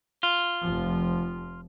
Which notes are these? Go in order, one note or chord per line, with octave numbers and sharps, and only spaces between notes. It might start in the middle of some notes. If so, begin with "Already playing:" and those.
F4
F1 F3